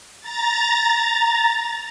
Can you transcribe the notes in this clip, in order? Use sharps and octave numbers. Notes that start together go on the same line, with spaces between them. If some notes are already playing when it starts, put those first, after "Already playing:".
A#5 A6